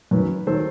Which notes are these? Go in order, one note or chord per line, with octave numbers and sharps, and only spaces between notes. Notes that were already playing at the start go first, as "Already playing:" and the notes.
F#2 D#3 F#3 B4
D#3 F#3 A4 C5